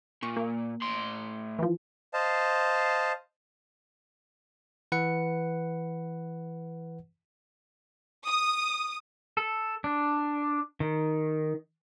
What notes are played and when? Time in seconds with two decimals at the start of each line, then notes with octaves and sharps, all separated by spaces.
0.23 A#2 C#6
0.36 A#3
0.82 A2 C6
1.59 E3 F3
2.14 C5 D#5 F5 A5
4.92 E3 B4 F#5 C#7
8.26 D#6
9.37 A4
9.84 D4
10.80 D#3